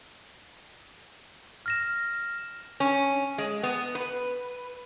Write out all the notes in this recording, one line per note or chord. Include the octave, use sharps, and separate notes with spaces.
F6 A#6 E7
C#4
G#3
B3
B4